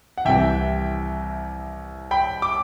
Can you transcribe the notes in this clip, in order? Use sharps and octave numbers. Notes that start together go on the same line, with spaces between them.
F#5
C2 C3 E3 E5 G5
G5 B5
D6